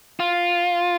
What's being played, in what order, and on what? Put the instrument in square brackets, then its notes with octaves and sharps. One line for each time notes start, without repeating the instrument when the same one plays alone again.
[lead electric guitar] F4